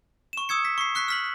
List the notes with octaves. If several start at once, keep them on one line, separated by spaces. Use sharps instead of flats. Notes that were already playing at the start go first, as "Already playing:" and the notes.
C#6 E7
D#6 E6 G#6 C#7
B6
C#6 C7
C#6 F#6 B6 C7
F6 B6 F#7